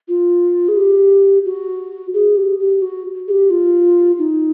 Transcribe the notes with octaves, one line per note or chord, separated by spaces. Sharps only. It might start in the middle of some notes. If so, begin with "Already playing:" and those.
F4
G#4
G4
F#4
G#4
G4
G4
F#4
G#4
G4
F4
D#4